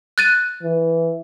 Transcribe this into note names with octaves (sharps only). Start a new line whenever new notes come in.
F#6 A6 D#7
E3